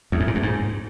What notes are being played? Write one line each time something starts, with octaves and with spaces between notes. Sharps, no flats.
E2
G#2
A#2
G2
G#2